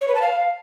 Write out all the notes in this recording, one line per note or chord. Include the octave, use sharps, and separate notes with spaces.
C#5
B4
A5
F5